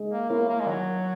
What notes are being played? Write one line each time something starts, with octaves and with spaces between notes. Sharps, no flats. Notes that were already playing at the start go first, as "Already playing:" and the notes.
Already playing: G#3
A#3
A#3 B3 E4 A#4 C#5
A#3
G#3
D#3 F#3